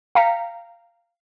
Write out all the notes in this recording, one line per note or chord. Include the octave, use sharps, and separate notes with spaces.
F5 G5 A#5 B6 C#7